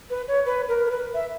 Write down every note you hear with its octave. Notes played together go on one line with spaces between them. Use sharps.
B4
C#5
B4
A#4
A#4
B4
E5